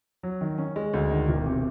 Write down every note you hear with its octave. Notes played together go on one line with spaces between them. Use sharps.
F#3
D#3
C#4
G#3
D2
D#3
E1
C3